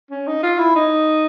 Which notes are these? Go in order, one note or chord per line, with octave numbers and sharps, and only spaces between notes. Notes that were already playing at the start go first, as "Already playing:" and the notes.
C#4
D#4
F4
E4
D#4